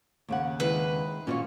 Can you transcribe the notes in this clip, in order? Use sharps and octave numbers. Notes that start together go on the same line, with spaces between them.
D#2 C#3 F#5
D#3 G#3 E4 B4
A#2 C#4 F4 F#4 C#5